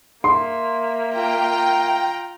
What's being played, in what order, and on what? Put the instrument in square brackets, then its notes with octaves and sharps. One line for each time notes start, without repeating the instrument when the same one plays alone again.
[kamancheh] A#3 E5 [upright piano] C6
[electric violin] F4 A#5 [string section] G5